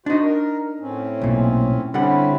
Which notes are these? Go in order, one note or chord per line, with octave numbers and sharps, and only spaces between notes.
D4 D#4 F#4 C5
A#4
A2 C4 C#4
B1 A#2
D3 G3 C4 C#4 E4 F#5